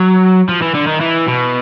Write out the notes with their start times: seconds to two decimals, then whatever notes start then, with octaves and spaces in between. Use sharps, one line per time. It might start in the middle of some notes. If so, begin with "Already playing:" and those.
Already playing: F#3
0.49 F3
0.62 E3
0.75 D3
0.87 D#3
1.01 E3
1.28 B2